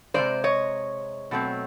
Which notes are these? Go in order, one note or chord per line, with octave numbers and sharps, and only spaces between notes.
C3 E3 G#3 C5 D5
C#5 D#5
B2 F#3 A3 C4